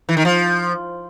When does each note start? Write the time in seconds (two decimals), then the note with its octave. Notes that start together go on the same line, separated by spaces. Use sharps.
0.09 E3
0.17 D#3
0.25 F3